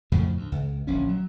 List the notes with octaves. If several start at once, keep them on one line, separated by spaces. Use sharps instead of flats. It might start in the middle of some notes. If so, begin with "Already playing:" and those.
F2 A2 C#3 F3
D2
C#2
D1 A#1 C#4
F#3